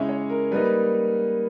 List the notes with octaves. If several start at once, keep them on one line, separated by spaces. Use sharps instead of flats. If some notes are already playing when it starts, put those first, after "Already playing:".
Already playing: C#3 G#3 C#4 E4
C#5
A#4
G3 A#3 D#4 B4